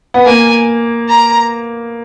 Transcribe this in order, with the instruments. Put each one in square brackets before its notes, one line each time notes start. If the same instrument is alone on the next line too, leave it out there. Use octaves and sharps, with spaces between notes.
[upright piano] B3
[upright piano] A#3 [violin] G#5
[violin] A#5